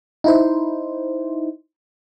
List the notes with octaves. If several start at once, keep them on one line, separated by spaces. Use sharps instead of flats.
D#4 E4 C5